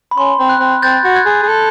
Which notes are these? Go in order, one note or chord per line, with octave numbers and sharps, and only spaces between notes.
B5
C#4 C6
C4
F#6
C4
C4 G6 A6
F#4
F#6 G#6
G#4
G#4
A4